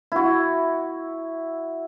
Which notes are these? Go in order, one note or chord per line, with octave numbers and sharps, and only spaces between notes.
E4 F#4